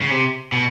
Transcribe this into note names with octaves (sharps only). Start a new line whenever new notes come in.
C#3
C3
B2